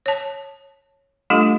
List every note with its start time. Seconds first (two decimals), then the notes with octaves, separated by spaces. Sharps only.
0.06 C#5 A5
1.30 G3 A3 D4 F4 G4 A4